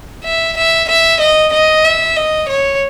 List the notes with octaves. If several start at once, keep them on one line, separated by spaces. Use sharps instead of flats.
E5
E5
E5
D#5
D#5
E5
D#5
C#5